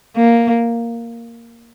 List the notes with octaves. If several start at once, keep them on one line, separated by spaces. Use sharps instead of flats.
A#3